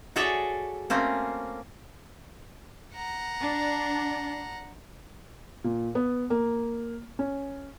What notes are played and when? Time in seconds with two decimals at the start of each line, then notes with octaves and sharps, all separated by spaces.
0.16 F#4 G#4 A4 C#5 D5 E5
0.90 A3 A#3 C4 C#4
2.94 F#5 A#5
3.41 D4
5.64 A#2
5.95 B3
6.30 A#3
7.19 C#4